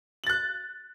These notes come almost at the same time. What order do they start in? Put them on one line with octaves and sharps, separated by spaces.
F#7 A6 F#6